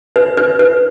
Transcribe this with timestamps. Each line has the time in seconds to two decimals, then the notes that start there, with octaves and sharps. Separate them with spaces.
0.16 B4
0.37 B4
0.59 B4